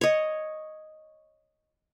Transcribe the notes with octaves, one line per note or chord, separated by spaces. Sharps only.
C#5 D#5